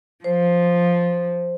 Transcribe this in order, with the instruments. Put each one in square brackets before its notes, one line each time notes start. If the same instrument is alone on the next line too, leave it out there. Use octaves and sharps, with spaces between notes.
[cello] F3 [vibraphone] C5